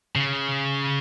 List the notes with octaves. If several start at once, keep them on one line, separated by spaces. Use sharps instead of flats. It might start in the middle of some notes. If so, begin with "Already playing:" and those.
C#3